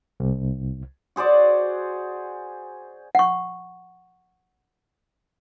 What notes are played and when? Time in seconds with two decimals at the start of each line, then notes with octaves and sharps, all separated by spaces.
0.20 C2
1.16 F#4 G#4 C5 D5
3.15 F#5 C#6